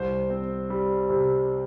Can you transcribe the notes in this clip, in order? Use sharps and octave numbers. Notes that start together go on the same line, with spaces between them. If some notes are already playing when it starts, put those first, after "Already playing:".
Already playing: C2 C5
C4
G3
C3